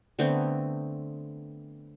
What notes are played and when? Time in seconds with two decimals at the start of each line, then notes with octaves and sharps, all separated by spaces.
0.19 D3 A3 B3 C4